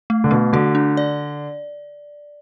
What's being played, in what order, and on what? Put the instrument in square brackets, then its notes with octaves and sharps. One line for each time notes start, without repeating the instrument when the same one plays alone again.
[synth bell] A3
[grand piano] D3
[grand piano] B2 [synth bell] A3
[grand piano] D3 [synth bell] F#4
[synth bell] D4
D5